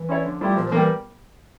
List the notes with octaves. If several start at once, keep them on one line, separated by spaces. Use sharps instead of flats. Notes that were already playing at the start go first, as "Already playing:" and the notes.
Already playing: E3
C#4 E4 A4 C#5
D3 F3
F3 G3 A3 E4 G4
A#2 F3
F3
E3 G3 A#3